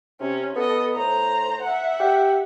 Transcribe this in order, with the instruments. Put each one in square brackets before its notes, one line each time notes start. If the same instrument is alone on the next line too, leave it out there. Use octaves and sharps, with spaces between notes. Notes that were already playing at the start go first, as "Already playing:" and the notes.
[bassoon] C3 [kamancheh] C#4
[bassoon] B3 [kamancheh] A4 D#5
[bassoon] A2 [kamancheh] C5 A#5
[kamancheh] E5 F#5
[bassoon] G4